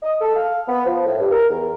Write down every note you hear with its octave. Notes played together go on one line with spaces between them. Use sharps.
D#5
A4
F5
B3
F3
A2
G2
A#4
E2